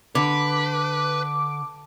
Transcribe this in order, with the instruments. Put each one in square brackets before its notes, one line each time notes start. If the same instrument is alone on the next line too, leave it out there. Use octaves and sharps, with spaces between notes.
[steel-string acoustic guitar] D3 [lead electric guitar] B4 [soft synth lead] D6